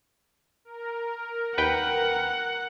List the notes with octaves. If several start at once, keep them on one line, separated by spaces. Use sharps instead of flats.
A#4
D#2 B4 F#5 G5